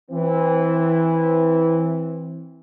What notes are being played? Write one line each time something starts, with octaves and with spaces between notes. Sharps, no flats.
E3 C4